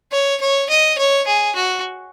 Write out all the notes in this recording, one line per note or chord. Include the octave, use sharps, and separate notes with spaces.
C#5
C#5
D#5
C#5
G#4
F#4